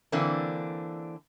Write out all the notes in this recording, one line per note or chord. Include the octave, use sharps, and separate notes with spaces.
D3 E3 A#3 C4 D4